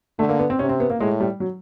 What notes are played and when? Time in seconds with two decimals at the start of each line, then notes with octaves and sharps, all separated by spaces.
0.19 D3 A3
0.29 A#3
0.39 B3
0.50 C4
0.59 C3 C#4
0.69 C4
0.80 B3
0.90 A#3
0.99 A2 G#3
1.20 G3
1.40 F#3